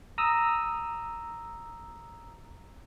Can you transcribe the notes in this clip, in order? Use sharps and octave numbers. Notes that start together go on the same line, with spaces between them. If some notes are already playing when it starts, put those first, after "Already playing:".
A#5 D#6 E6